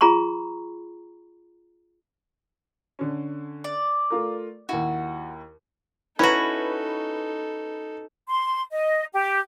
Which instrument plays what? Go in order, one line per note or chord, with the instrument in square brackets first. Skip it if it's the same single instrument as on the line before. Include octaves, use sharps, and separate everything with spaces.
[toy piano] F4 G#4 A#5 B5 C#6
[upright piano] D3 C#4
[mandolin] D5
[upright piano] A3 F4 A#4
[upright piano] D#2 E4 [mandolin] F#4
[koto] C#4 F#4 [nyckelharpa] D#4 A4 [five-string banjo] E4 A#5 [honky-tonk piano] B4
[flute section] C6
D#5
G4